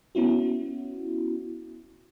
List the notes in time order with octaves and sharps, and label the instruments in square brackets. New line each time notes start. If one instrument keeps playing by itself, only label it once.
[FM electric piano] B3 C#4 E4 F#4